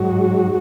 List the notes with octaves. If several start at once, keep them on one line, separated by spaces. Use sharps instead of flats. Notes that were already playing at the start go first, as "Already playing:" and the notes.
Already playing: G#2 F#3 F#4